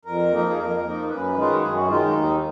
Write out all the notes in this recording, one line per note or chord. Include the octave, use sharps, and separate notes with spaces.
F2 A#4
F3 A#3 D#4
G#4
F2 A#4
F3 A#3 D#4
F#2 B4
D#3 G#3 D#4 F4
F#4
F#2 G#4
F#4
D#3 G#3 D#4 F4
D#4
D#2